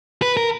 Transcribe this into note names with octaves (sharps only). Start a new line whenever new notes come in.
B4
A#4